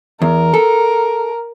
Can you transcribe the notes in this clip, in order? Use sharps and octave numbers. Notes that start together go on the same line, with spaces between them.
E2 A#4
A4